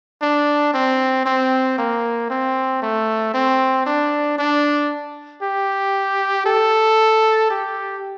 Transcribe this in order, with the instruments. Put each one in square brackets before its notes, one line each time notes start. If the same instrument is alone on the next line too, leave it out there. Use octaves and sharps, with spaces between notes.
[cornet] D4
C4
C4
A#3
C4
A3
C4
D4
D4
G4
A4
G4